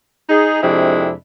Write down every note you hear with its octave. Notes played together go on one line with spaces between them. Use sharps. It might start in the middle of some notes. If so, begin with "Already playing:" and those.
D#4 G#4
F2 C3 G#3 D4 E4